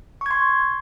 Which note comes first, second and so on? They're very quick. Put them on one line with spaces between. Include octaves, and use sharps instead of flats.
C#6 G#6 C6